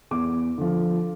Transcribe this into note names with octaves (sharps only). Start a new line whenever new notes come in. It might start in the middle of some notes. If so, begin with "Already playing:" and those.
E2 D6
D3 F3